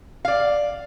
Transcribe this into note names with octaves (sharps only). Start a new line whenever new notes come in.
D5 F5